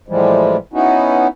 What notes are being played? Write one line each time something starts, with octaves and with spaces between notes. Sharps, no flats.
A2 E3 F3 G3 G#3
B3 C#4 D#4 E4 F#4